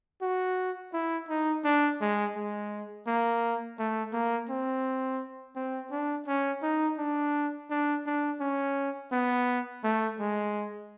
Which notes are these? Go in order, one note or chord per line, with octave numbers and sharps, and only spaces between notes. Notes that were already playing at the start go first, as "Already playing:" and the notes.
F#4
E4
D#4
D4
G#3
G#3
A#3
A3
A#3
C4
C4
D4
C#4
D#4
D4
D4
D4
C#4
B3
A3
G#3